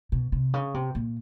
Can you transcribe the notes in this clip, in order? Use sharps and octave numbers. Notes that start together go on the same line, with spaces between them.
B2
C3
C#3
C3
A#2